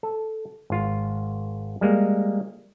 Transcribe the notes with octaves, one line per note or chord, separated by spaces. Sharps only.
A4
G#1 F4
G3 G#3 A#3